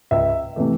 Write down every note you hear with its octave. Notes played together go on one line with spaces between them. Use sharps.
C#2 E5
C3 E3 A3